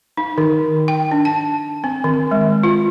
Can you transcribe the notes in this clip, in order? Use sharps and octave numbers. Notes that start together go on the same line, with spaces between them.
D#4
D#3
G5
D4
A5
C4
D#3
G#3
F4